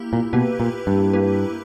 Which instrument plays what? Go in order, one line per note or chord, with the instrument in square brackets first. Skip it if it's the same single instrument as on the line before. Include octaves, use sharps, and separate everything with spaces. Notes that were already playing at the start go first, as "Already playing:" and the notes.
Already playing: [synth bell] A#3 E4 G4
[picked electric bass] A#2
[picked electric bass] B2 [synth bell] A#3 E4 G4 B4
[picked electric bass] A#2
G2
[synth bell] A#3 E4 G4 B4